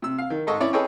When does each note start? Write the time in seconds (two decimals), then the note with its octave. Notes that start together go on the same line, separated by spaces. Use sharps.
0.02 C3 E6
0.18 F5
0.30 D#3
0.47 G#2 A4 D#5 C#6
0.60 C#4 E4 C#5 D5
0.73 G#4 A4 B4 C#5 D#5 G5